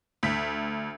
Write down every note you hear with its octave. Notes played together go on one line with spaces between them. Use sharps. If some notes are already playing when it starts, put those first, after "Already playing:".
D2 B6